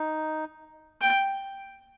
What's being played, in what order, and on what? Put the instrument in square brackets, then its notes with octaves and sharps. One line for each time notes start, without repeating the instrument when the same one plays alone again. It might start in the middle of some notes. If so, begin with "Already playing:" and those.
Already playing: [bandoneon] D#4
[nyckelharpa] G5